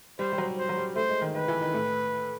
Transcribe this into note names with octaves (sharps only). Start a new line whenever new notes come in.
G3 C5
G3
F#3
C5
F#3
G3
A3 C5
G#3
D#3
D#3 B4
E3
D#3
A2